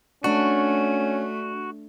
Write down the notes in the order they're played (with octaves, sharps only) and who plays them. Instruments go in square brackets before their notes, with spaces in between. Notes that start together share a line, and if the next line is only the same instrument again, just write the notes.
[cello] A3 [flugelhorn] C#4 [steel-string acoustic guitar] D4 [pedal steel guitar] F#4